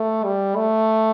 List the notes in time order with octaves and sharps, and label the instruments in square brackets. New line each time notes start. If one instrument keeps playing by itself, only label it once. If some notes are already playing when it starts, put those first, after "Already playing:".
Already playing: [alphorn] A3
G3
A3